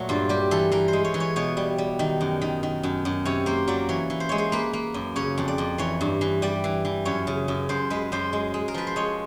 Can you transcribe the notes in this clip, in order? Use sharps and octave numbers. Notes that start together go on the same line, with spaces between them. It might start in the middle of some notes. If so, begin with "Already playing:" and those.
Already playing: A#2 F#3 A3
G2 F4
G3 G4
E3 A4
E3 A#4
C5
G#3
C#5
E3
C#5
B2 C#5
G3
G3
D#3
F#2
D#3
D#3
F#2
F#2
C3 C#5
A#3 C5
F#3 D5
E3 C#5
E3
C5
G#3 C#5
C5
A#3 B4
A#3
F#2
C#3 C#5
F2
D5
F2
E3 C#5
G2
E3
G3 D5
E3
E3
F#2 C#5
C#3
F#2
F#2 C5
G#3 B4
F#2 C5
G#3
G#3
A#4
F3 B4
C5
G#3 C#5